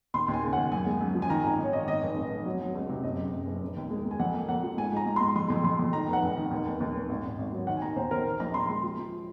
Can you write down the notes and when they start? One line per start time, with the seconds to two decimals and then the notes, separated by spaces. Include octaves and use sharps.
0.14 D#2 C6
0.28 D#2
0.33 G#5
0.43 C#3
0.53 F#5
0.57 D#2
0.72 F#2 G#5
0.86 G#3
1.01 F#2
1.15 F3
1.22 G#5
1.29 D#3 A#5
1.44 G#1 G#5
1.59 D#3 C#5
1.73 G#1 D#5
1.88 D#3 D#5
2.02 F1
2.17 F1
2.31 F1
2.46 F#3
2.60 F#3
2.75 C#2
2.89 C3
3.03 F#1 D#5
3.18 F#2
3.33 F#1
3.47 F#1
3.62 F1
3.77 D#2
3.91 G#3
4.05 G#3
4.11 G#5
4.20 F2 F#5
4.34 A#3
4.49 F2 F#5
4.63 F3
4.78 G#2 G#5
4.92 G#2 A#5
5.06 G#2
5.16 C6
5.21 G#2
5.36 F2 C6
5.50 F2
5.64 F2 C6
5.79 F2
5.93 D#3 A#5
6.08 F1
6.13 F#5
6.22 F1
6.37 D#3
6.51 D#2
6.66 F1
6.80 D#2
6.94 F1
7.09 G#1
7.24 G#1
7.38 G#1
7.52 F#3
7.67 D#3 F#5
7.77 G#5
7.82 D#2 A#5
7.96 D#2 C5
8.11 D#2 A#4
8.25 D#3
8.40 A#1 A#5
8.54 A#1 C6
8.69 G#3 C6
8.83 F3
8.98 F3